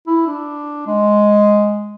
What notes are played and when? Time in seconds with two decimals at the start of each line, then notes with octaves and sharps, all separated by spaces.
0.07 E4
0.27 D4
0.87 G#3